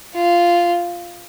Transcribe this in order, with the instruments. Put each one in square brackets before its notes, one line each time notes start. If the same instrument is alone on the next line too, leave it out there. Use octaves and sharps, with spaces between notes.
[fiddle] F4